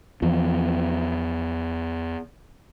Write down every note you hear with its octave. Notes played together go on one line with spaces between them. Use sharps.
E2 F3